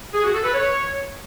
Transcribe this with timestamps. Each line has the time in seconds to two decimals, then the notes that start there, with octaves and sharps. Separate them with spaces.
0.14 G#4
0.24 F#4
0.34 A4
0.44 B4
0.54 C#5